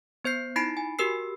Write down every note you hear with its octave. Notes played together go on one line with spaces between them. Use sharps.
B3 C5 G6 C7
D#4 E4 B5 A6 C7 D7
G#5
F#4 G4 A#4 E6 C7